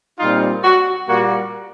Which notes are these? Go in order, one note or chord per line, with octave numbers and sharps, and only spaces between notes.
A#2 G3 C4 D#4 F4
F#4
A#2 G3 A#3 F#4